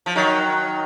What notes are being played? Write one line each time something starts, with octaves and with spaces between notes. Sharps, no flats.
F3
D#3 F#3